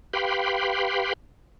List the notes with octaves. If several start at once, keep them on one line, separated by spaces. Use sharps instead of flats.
G4 B4 F5 G5 B5 C6